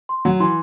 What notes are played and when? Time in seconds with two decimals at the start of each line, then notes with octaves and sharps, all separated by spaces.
0.09 C6
0.25 F#3 F#5
0.40 E3 C6